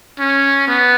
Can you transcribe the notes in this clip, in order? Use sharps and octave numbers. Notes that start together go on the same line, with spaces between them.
C#4
B3